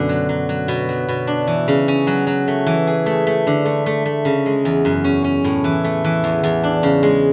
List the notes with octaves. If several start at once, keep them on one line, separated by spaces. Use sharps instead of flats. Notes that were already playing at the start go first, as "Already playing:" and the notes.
Already playing: F#2 B2 D3 A3
F#3
F#3
F#3
B2
F#3
B2
D4
E3
C#3
C#4
F#3
F#3
A3
E3
G#4
A3
A3
D3
A3
A3
A3
C#3
G#3
E2
F#2
C#4
C#4
A2
E3
A3
E3
E2
E2
D4
C#3
G#3